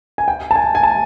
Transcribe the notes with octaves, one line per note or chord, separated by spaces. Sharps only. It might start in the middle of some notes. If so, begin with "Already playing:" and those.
G#5
G5
A5
G#5
G#5
A5